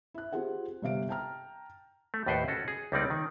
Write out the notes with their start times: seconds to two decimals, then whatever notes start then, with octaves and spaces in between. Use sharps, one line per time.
0.14 E4 F#6
0.33 C4 F4 G4 G#4 F#5
0.82 G1 C3 F5 D7
1.09 G5 A5 A#5 F6
2.14 A3
2.26 D#2 A2 B4 C5 F#5 G5
2.48 C#4 F#4 A4
2.68 G#4
2.92 C#2 G3 A#3 C4 D#4 D5
3.10 D#3